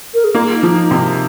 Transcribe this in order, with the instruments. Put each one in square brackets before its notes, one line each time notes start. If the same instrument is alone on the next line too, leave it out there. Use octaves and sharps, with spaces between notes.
[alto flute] A#4
G#4
[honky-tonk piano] A#3 [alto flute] F4
[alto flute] D#4
[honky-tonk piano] F3
[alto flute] D#4
[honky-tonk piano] C3